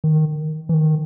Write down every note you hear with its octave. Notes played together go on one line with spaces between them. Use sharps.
D#3
E3
D#3